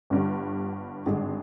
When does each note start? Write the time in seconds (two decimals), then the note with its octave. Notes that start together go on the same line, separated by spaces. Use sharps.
0.10 G1 G2 D3 G3
1.06 G#1 G2 D3 G#3